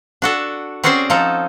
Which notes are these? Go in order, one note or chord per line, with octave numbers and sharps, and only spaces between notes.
D4 F#4 A4
C4 C#4 F#4 G#4 C5 D5
F3 D#4 A4